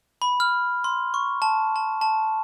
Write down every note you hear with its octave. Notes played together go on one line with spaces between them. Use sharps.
B5
F6
C6
C#6
A5
A5
A5